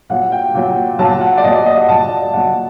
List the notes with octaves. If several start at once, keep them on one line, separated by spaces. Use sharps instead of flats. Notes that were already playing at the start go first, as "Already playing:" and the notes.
A#2 F#3 F#5
G5
A#2 F#3
A#2 F#3 A5
F#5
D5
A#2 F#3 D#5
D5
D#5
F#5
A#2 F#3 A5
D5
D#5
A#2 F#3 F#5